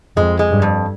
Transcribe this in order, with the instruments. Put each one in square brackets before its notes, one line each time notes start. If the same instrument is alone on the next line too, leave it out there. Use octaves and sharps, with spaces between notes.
[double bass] F2 [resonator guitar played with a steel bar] G#3
[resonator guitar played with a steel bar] G#3
[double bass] G2
[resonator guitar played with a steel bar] F2